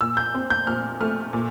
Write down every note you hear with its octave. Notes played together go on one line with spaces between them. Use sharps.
A#2 E6
G6
C4
G6
A#2 F6
A3 F6
A#2